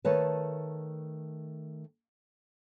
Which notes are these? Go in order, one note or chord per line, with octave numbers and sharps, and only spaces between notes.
D#3 A3 B4 C#5 A5